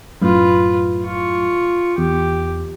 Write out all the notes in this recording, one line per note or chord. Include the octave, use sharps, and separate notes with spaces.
F#2 A2 F4 B4
F4 C#6
E2 G4